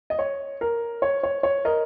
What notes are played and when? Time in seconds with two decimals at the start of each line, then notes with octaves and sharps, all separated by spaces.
0.10 D#5
0.19 C#5
0.61 A#4
1.02 C#5
1.23 C#5
1.43 C#5
1.65 A#4 D#5